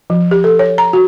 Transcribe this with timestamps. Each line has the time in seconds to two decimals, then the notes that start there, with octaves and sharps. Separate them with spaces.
0.10 F3
0.31 G4
0.44 A4
0.59 C#5
0.78 A#5
0.93 F#4